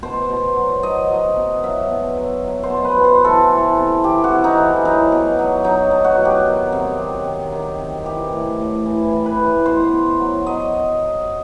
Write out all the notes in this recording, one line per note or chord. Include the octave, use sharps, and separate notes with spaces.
B2 C5
B2
F#3
F#3 D#5
F#3
B2
F#3 E5
B2
F#3
F#3
C5
B2
B4
B2
C5
E3 A4
E3
C3
E3 G4
F#4
C3
D#4
E3
F#3 D#4
B2
F#3
F#3 D#4
B2
F#4
F#3
G4
D#3
C3
F#3
D#3
D#3
C3
E3 G4
A2
A2
E3
E3
B4
A2
B2 C5
B2
F#3
F#3 D#5